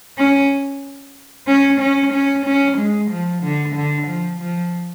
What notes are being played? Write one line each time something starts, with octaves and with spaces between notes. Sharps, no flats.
C#4
C#4
C#4
C#4
C#4
G#3
F3
D3
D3
F3
F3